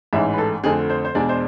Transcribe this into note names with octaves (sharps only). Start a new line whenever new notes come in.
A1 G#2 E3 E5
B4
A4
F2 D3 A3 C4 G#4
C5
C5
E2 B2 G#3 D4 D5
C5